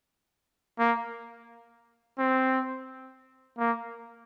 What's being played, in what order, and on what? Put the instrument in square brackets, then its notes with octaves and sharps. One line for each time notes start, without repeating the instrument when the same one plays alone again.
[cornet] A#3
C4
A#3